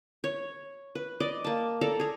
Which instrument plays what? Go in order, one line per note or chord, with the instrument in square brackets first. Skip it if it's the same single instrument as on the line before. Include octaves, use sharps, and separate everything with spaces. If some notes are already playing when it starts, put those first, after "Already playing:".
[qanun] C#5
B4
D5 D#5
A#3 A5
A4 D5 A#5
G#4 A#5